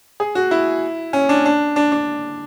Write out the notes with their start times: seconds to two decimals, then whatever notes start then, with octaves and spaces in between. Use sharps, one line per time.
0.20 G#4
0.35 F#4
0.51 E4
1.13 C#4
1.29 D4
1.45 D4
1.76 D4
1.92 D4